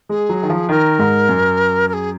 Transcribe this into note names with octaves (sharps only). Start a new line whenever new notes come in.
G#3 G#4
F#3
D#3
F3
D#3 A#4
G#2
F#2
A#4
G#4